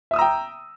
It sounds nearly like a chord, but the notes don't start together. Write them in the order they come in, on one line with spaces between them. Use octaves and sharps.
E5 D#6 E6 A#5 G5